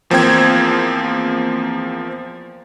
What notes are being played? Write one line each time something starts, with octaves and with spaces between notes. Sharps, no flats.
E2 F3 A#3 C4 G5 G#6